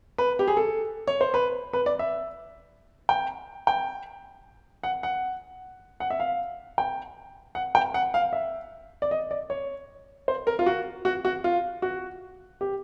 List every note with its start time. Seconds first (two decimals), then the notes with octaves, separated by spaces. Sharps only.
0.18 B4
0.39 G4
0.48 G#4
0.57 A4
1.07 C#5
1.21 C5
1.34 B4
1.73 B4
1.86 D5
1.99 E5
3.09 G5
3.67 G5
4.83 F#5
5.03 F#5
6.00 F#5
6.10 E5
6.20 F5
6.78 G5
7.55 F#5
7.75 G5
7.94 F#5
8.14 F5
8.33 E5
9.02 D5
9.11 D#5
9.31 D5
9.50 C#5
10.28 C5
10.47 A#4
10.59 F4
10.66 F#4
11.05 F#4
11.25 F#4
11.44 F4
11.82 F#4
12.61 G4